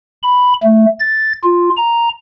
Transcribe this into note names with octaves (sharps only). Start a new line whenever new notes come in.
B5
A3
A6
F4
A#5